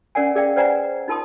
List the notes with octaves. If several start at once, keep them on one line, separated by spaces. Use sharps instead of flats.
C#4 A#4 D5 F#5 G#5
G#4 A#4 D5 E5 F5 G5
B4 C5 D5 F#5 G#5 A#5
D#4 F4 A#4 A5 C6 D#6